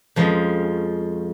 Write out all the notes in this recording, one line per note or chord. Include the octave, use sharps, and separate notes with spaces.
F2 F3 G#3 C#4